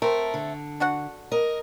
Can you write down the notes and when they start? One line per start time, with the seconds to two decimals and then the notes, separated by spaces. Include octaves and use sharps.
0.02 A3 C4 A#4
0.34 D3
0.80 D4 F#4 F#5
1.32 A#4 D#5